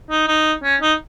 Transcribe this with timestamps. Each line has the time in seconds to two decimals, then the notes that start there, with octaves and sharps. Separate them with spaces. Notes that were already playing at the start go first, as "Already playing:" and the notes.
0.10 D#4
0.28 D#4
0.63 C#4
0.81 D#4